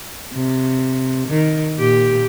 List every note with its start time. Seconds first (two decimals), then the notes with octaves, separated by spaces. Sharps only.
0.33 C3
1.28 D#3
1.78 A#2 G4